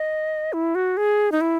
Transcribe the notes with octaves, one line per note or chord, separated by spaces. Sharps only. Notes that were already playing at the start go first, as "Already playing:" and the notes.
Already playing: D#5
E4
F#4
G#4
D#4
E4